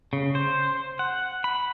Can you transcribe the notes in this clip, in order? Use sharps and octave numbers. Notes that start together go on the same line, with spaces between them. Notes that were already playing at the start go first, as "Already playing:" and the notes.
C#3
C5
F#5
B5